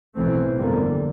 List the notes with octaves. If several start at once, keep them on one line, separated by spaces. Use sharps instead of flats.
B1 A2 E3 A3 C4
G1 F2 D3 G3 A#3